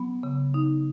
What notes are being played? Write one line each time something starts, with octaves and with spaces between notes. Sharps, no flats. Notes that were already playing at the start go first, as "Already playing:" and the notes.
Already playing: F#3 B3
C#3
D#4